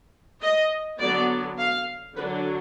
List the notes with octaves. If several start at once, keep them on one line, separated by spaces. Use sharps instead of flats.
D#5
D3 F#3 B3 D5
F5
D3 F#3 D4 B4